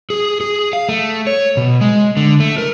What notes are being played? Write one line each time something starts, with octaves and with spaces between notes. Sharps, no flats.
G#4
G#4
F5
A3
C#5
B2
G#3
D3
A3
A#4